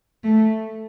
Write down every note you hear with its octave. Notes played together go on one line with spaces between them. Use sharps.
A3